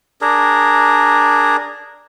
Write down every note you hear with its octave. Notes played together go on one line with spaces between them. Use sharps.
D4 G#4 A#4